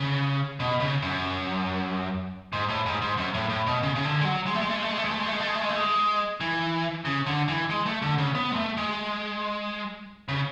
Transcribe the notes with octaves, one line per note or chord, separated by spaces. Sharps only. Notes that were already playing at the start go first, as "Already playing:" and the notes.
Already playing: C#3
B2
C#3
F#2
G#2
A2
G#2
G#2
F#2
A2
A2
B2
C#3
C#3
D3
G#3
F#3
G#3
A3
G#3
A3
G#3
A3
G#3
A3
G#3
A3
G#3
A3
G#3
A3
G#3
A3
G#3
A3
G#3
E3
C#3
D3
E3
G#3
A3
D3
C#3
B3
G#3
A3
G#3
C#3